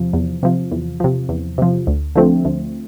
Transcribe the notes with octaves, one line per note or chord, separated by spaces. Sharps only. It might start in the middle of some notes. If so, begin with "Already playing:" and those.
Already playing: E2 C3 F3
E2
C3 F3
E2
C3 F3
E2
C3 F3
D2
D3 F3 A3 C4
D2